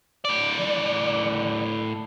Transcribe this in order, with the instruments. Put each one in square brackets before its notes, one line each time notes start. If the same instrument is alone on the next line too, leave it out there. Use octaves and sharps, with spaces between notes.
[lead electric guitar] A2 D5